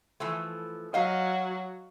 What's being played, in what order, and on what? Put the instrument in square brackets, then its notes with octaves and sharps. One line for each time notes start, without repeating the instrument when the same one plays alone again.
[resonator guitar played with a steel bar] E3 F3 A3
[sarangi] F#3 [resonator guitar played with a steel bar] D#5 F5